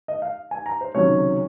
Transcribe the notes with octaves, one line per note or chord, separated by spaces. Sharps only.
D#5
F5
G#5
A#5
C5
C#2 C3 D#3 F#3 C#4 C#5